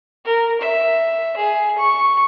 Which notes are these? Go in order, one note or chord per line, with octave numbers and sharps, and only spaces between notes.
A#4
E5
G#4
C#6